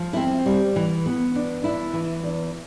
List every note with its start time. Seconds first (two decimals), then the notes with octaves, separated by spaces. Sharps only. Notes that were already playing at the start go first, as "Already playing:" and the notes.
Already playing: F3
0.13 C4 E4
0.46 G3
0.76 E3
1.06 B3
1.35 D4
1.64 D4 E4
1.93 E3
2.24 E2